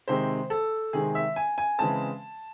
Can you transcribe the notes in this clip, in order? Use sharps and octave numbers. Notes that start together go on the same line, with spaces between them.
C3 D#3 G#3 C4 C5
A4
C3 D#3 G#3 C4 G#4
E5
G#5
G#5
C#3 E3 G#3 C4 A5